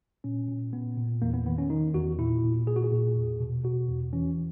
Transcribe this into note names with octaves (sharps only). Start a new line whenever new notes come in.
A#2 C#4
A#2
A#2 B3
A#2
E2 A#3
B3
D#3 B3
C#4
D#3 D#4
E2 F#4
A#2 E4
A#2
A#2 G#4
F#4
G#4
A#2
E2
B2
B2 F#4
E2
E3 C#4